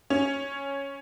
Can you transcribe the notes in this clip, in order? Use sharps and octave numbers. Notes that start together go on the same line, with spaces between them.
C#4